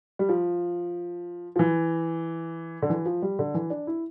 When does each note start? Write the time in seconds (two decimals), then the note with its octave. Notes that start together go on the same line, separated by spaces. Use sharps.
0.19 G3
0.29 F3
1.56 F3
1.59 E3
2.82 D3
2.90 E3
3.06 F3
3.22 G3
3.39 D3
3.54 E3
3.70 D4
3.87 E4